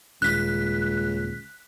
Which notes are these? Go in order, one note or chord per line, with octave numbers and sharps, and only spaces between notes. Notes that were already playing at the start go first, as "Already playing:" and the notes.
D#1 C#2 F#6 B6